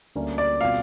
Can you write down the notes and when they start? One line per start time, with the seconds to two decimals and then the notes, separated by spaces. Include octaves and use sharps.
0.15 D2 D3 G3 A#3 C#4
0.38 D5
0.60 B2 G3 C4 F4 F5